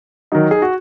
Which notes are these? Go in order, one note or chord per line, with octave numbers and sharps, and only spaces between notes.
D#3 F#3 D#4
G#4
F#4